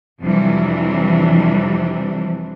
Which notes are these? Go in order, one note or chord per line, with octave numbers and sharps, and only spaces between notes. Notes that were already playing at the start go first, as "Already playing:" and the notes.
F2 C3 E3 F#3 G3 D4